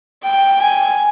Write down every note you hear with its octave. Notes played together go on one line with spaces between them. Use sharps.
G5
G#5